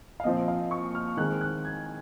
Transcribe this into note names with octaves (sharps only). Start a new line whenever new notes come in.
F5
A#2 F3 C4 D#5
F5
C#6
F6
D#3 G#3 C4 F#6
F#6
G#6